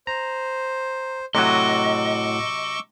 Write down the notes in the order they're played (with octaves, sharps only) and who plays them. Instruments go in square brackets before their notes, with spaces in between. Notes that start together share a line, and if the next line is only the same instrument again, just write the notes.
[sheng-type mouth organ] C5 [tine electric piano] A#5
[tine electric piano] A2 F#4 [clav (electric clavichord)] C3 F#3 [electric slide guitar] D#5 [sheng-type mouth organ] C#6 D6 E6